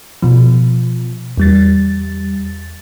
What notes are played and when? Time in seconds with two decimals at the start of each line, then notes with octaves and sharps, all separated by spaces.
0.22 B2 F3
1.37 E2 G3 A6